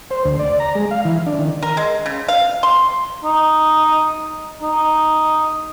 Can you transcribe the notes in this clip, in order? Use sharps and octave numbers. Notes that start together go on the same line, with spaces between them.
C5
D2
D5
A#5
G#3
F5
E3
D4
D#3
A#4
G#3
C#3
F5
C6
D#4
D#4